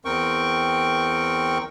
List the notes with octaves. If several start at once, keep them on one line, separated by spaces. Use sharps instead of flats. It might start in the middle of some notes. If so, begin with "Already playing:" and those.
E2 C4 A#4 G5 C#6